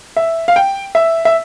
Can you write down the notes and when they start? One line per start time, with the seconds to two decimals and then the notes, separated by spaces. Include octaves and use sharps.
0.17 E5
0.48 F5
0.56 G5
0.95 E5
1.25 E5